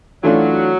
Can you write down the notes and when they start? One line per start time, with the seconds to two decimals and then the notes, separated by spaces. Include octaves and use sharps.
0.23 E3 F#3 A3 D4 F4